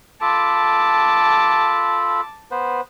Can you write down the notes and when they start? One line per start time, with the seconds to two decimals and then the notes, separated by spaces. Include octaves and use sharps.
0.21 F4 A4 A5 B5 D6
2.51 B3 B4 C5